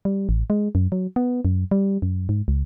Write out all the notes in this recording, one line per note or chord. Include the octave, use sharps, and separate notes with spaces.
G3
A1
G#3
F#2
F#3
B3
F#2
G3
F#2
G#2
C#2